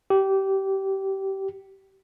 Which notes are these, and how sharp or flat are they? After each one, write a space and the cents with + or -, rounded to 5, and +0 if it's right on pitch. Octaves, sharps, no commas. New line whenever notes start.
G4 -20